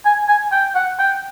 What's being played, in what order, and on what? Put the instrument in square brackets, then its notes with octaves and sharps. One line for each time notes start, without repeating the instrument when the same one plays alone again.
[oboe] G#5
G#5
G5
F#5
G5